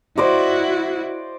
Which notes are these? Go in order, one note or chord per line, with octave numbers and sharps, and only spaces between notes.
E4 F#4 C5 D5 D#5